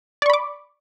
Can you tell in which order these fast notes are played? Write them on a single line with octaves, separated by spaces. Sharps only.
D5 C#6 B5 D6